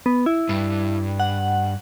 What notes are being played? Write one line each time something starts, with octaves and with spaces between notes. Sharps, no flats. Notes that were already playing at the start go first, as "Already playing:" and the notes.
B3
E4
G2
F#5